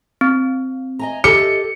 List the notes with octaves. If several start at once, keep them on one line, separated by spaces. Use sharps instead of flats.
C4
D#5 G#5 A#5
G4 A4 D#5 D6 C#7